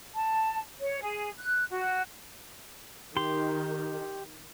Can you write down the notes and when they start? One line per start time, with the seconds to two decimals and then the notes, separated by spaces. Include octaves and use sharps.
0.15 A5
0.81 C#5
1.01 G#4
1.37 F#6
1.70 F#4
3.17 D#3 G4 C6